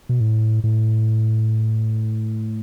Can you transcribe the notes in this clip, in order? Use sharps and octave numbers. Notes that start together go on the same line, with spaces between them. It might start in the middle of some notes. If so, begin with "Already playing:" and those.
B2
A2
A2